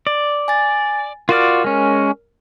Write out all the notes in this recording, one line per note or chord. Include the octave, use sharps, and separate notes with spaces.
D5
G#5 A6
F4 F#4 A#4 D5 F6
G#3 C#4